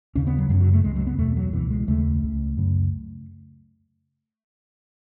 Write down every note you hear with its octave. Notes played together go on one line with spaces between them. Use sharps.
D#2 C#3 C#4
B3
F#3
F#2 C#3 F#3
F#3
A3
C#2 C#3 G#3
F#3
B3
E2 B2 A3
F#3
C#2 B2 E3
G#3
D#2 C#3 A3
C#2 C#3
F#2 C#3